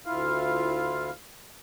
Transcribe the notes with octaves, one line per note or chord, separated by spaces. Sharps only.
D2 E4 F4 F5